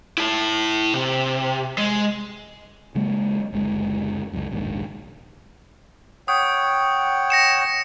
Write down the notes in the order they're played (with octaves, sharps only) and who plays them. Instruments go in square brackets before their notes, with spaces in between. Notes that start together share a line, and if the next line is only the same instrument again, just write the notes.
[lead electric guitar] E4 A5
C3
G#3
[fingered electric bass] C#3 F#3 G#3 A#3
F#1 D2 G#3
C#2 F#2
E1 A#1 D#2 G#2
[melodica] C#5 F#5 G5 [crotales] D#6
[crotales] A#6 C#7 E7